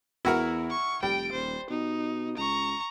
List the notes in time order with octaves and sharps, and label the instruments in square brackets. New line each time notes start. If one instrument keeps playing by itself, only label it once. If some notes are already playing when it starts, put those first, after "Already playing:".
[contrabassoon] E2 [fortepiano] E4 F#4 A#4
[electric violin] C#6
[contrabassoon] F1 [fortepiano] G3 [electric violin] G5 D7
[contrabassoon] D#1 [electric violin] C5
[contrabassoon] B2 [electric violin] D#4
[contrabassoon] C#2 [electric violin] A#5 C#6